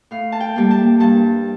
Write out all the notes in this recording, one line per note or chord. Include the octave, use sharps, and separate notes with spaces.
A2 F5
A5
G5
G3 A#3
A5
G2 A5